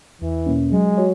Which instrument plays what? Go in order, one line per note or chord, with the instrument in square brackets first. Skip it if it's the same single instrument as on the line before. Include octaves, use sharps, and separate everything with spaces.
[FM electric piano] E2 [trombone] E3
[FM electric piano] B2 A#3 C#4
[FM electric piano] F#3 [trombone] G#3
[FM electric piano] F#4 C#5